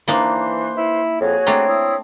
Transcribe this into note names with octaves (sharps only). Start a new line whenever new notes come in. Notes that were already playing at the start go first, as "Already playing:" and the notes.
E3 A#3 D4 D#4 B4 C5 C6
E4
F2 F#4 G#4 C#5
A3 C4 D4 A#5
E4 D#6